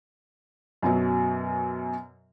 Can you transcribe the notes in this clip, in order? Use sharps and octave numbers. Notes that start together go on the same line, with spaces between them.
F#2 B2 F#3